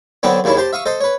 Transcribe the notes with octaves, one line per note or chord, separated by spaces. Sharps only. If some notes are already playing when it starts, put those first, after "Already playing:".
D3 F#3 B3 C4 D4
D#2 C#3 D4 E4 C#6
G4 C5 A5 C6
E5 F5 C#6 D#6
A4 C5 D#5
B4 C#5